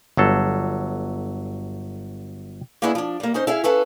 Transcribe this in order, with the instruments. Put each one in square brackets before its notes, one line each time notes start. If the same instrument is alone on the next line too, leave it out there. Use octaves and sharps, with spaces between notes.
[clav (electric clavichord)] G1 F#3 A4
[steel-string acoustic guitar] A#3 B3 C#4 D4 E4 G#4
F3 D4
G3 A#3
C#4 D#4 C5
E4 G#4 E5 F5
C#4 A4 B4 F5 A5